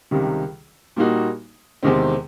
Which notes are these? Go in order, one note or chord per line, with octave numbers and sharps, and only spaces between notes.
C#2 C3 D#3 G3
A#2 G3 A#3 D#4 F#4
E2 C3 D#3 G#3 C4